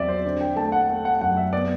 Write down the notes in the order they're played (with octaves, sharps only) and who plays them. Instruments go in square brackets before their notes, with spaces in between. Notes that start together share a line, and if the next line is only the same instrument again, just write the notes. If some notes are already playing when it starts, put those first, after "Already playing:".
Already playing: [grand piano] E2 F#3 C4 D5 E5
C5
D3
G5
A3 A5
F#5
A3
F#5
F#2 F#5
E5
B3 D5